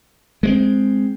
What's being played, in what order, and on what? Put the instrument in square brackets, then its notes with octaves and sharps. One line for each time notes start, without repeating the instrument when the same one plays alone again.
[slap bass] G#3 A3 C4